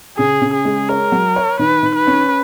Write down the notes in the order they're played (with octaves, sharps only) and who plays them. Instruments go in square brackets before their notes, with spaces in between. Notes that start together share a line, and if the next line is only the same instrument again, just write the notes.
[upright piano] C#3 [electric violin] G#4
[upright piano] C#3
[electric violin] G#4
[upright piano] G#3
[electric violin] A#4 [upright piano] C#5
[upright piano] F#3
C#5
[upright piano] D#3 [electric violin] B4
[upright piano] D#3
[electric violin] B4
[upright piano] C#4